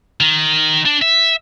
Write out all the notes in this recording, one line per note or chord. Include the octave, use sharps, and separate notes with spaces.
D#3
D4
E5